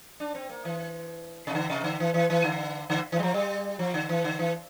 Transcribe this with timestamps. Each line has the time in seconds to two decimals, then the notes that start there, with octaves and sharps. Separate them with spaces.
0.20 D4
0.35 C4
0.49 A#3
0.65 E3
1.47 C3
1.55 D3
1.70 C3
1.84 D3
2.00 E3
2.14 E3
2.30 E3
2.44 D3
2.90 D3
3.12 E3
3.19 G3
3.23 F3
3.34 G3
3.79 F3
3.94 D3
4.09 E3
4.24 D3
4.39 E3